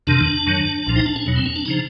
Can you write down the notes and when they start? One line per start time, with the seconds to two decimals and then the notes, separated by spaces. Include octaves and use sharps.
0.07 F2 C3 D#3 D4
0.47 F#2 D#3 F#3
0.87 C2 A#2 F3
0.96 D#4
1.06 D4
1.16 C#4
1.26 E2 B2 F#3
1.36 C4
1.46 C#4
1.56 D4
1.66 C#3 F3 D#4